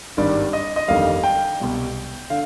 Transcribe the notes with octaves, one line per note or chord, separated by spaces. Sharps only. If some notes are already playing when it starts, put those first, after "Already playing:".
G#1 G2 D#3 G3 D5
D#5
D#5
G1 F2 D#3 G3 F5
G5
C2 B2 G3
D3 F5